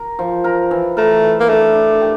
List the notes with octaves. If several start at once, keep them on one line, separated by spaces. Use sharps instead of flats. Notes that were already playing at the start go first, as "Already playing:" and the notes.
Already playing: A#4
F3
A#4
E3
A3 A#4
E3
A#3
A3 D4
D4
G4